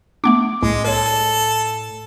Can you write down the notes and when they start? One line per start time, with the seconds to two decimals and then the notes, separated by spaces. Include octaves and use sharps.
0.24 A3 B3 D4 D6
0.63 C2 A2 G#3
0.85 A4 A#4 C#5